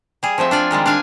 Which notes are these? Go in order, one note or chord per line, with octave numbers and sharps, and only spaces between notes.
G3 G#4
F3 A3 C4 E5
D4 F4 D5 G#5
D#3 G3 G#3 A#4
D4 D5 F5 G#5